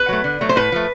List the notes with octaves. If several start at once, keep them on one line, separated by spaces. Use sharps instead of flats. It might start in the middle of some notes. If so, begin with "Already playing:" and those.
Already playing: B4
F#3 A3
D3
F#3 A3
C5
A2 B4
F3 A3